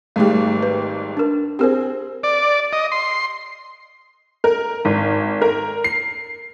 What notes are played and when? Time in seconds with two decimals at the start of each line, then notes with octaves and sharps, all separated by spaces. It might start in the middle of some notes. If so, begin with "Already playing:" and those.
0.16 G#1 G#2 G3 A3 G#4
0.63 B4
1.17 D4 A#4
1.59 C4 G4 G#4 A#4 C5
2.23 D5
2.73 D#5
2.92 C6
4.44 A#4
4.85 G#1
5.41 A#4
5.84 C7